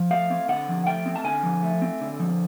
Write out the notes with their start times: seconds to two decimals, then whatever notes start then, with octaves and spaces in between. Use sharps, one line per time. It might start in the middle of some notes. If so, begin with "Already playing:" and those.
Already playing: F3
0.11 A3 F5
0.30 C4
0.48 D3 F#5
0.69 F3
0.86 A3 G5
1.06 C4
1.16 A5
1.24 D3 G#5
1.43 F3
1.63 A3
1.82 C4
2.01 D3
2.20 F3